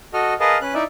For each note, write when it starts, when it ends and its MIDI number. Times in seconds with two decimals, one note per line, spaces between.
0.14 0.34 66
0.14 0.34 69
0.14 0.34 75
0.14 0.34 89
0.40 0.58 68
0.40 0.58 70
0.40 0.58 71
0.40 0.58 75
0.40 0.58 77
0.40 0.58 81
0.61 0.74 61
0.61 0.74 71
0.61 0.74 90
0.74 0.84 63
0.74 0.84 64
0.74 0.84 74
0.74 0.84 76